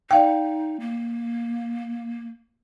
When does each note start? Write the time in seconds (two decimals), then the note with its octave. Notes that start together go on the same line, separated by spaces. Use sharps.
0.11 D#4 D5 F5 G5
0.80 A#3